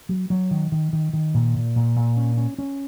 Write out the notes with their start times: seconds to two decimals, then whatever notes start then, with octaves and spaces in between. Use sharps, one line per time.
0.09 F#3
0.30 F#3
0.51 D#3
0.72 D#3
0.93 D#3
1.13 D#3
1.34 A#2
1.55 A#2
1.76 A#2
1.96 A#2
2.17 C#4
2.37 C#4
2.58 C#4